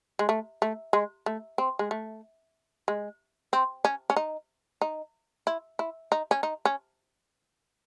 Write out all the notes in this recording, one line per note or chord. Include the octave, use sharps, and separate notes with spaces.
G#3
A3
A3
G#3
A3
C4
G#3
A3
G#3
C4
C#4
C#4
D#4
D#4
E4
E4
D#4
C#4
D#4
C#4